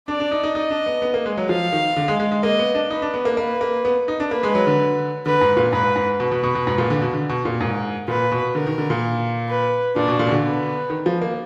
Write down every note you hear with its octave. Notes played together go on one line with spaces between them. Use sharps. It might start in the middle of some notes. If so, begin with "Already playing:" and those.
D4 D5
D4
D#4
D#4
D#4 D#5
D4
B3
B3
A#3
G#3
F#3
F3 F5
D#3
D3
G#3
G#3
G#3
A#3 D#5
B3
D4
D#4 B4
D4
B3
A#3
A#3 B4
A#3
B3
D#4
D4
A#3 B4
G#3
F#3
D3
D3 B4
G#2
A#2
G#2 B4
G#2
B2 B4
B2
B2
B2
G#2
A#2
D3
B2
D3
B2
A#2
G#2 A#4
A#2 B4
B2
D3 A#4
D#3
D3
A#2
B4
A#2 D4
B2
A#2
B2
D3
B3
D#3
F3
A#3